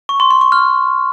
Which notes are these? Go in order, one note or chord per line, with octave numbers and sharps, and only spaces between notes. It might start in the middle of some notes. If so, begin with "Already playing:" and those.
C#6
C6
C6
C#6
F6